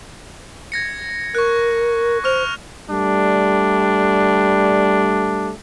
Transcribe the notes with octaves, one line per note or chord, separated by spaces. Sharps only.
G#6 A#6 C#7
A#4 C#6 F#6
C5 C#6 F6 F7
G3 A3 D4